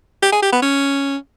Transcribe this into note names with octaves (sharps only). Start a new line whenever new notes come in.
G4
G#4
G4
B3
C#4